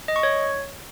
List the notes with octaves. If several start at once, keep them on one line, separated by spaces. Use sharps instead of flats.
D#5
C#6
C#5